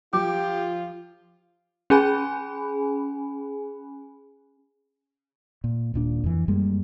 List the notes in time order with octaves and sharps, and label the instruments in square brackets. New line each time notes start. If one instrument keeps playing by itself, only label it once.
[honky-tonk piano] F3 [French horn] F4 [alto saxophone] G4 [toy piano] D6
[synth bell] C#4 G#4 G#5 B5
[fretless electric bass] A#2
D#1 A#2 D4
F2 E3
F#2 G3 G#3 A#3